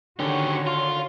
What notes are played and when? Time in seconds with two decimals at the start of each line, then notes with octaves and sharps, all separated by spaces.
0.20 D3 D#3 C#4 F#4 G4 C#5
0.67 F4